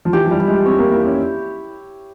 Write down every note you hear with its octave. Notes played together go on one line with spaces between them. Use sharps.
F3
E3 G4
F3
G3
E4
G#3
C4 C#5
A#3
A#3 E4
C#4